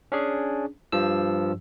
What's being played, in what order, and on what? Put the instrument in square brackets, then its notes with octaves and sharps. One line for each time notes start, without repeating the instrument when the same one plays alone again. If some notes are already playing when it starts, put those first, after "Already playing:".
[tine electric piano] C#4 D4 G#4
G2 F3 E6